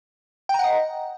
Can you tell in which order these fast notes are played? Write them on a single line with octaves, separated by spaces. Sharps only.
G5 A#5 F#5 D#5